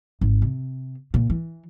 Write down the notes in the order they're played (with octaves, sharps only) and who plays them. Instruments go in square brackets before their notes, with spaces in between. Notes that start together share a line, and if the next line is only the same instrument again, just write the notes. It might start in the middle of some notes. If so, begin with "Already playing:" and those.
[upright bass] G#1
C3
A#2
E3